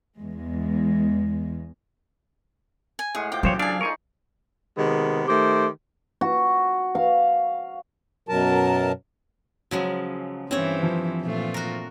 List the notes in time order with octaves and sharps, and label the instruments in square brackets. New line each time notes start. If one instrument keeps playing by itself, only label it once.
[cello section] E2 G#3
[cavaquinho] G#5
[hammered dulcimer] A2 G#3 F#5 [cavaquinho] G#4
[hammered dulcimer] F3 G4 D6 [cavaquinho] G5
[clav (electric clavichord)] B1 C5 C#5 [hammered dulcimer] C#3 [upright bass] F#3 [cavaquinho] G4
[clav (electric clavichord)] D4 [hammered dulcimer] G#4 A4 D5 [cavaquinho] F5 G#5
[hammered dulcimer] D#4 C6 C#6 [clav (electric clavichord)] A#4 G#5
[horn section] C3 D#3 G#3 B3
D#3 A3 G4 C5
[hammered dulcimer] F#4
F5
[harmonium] F#2 B2 F#3 A#4 A5
[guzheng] C#3 F3 G#3 [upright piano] F#3
[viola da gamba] G2 E3 [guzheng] C4 C#5 [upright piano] C#4
[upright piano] F3
[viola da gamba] A#2 A3 F4
[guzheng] F#4 A#4